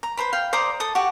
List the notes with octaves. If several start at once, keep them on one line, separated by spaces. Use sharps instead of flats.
A#5
B4 C5 A#5 B5
F5 G5
C5 D5 A#5 D#6
A4 D#6
F#4 G4 F#5 A5